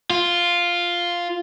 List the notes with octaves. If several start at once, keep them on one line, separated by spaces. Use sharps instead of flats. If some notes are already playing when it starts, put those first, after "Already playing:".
F4